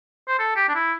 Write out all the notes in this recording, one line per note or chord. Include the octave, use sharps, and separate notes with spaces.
C5
A4
G4
D4
E4